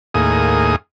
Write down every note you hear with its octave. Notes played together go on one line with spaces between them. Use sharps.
D#2 A2 A#3 G#4 D#6